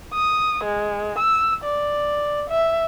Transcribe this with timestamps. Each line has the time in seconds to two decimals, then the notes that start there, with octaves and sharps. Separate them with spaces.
0.14 D#6
0.64 G#3
1.19 E6
1.64 D5
2.50 E5